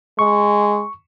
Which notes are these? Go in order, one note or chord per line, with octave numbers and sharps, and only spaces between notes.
G#3 C#6